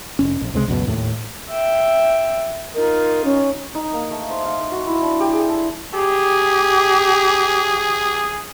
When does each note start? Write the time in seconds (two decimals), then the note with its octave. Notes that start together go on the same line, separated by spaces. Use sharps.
0.19 F1 C#4
0.41 A#1
0.54 C#2 C3 D#3 G#3
0.68 C#2 F#2 B2
0.88 D#2 A2
1.49 E5 G5
2.75 D#4 F4 A#4
3.24 C#4
3.75 D#4
3.93 A#3
4.11 A3
4.30 C5
4.45 F5
4.60 C5
4.71 F#4
4.86 E4
5.02 D4
5.20 G4
5.32 G#4
5.49 A4
5.94 G4 G#4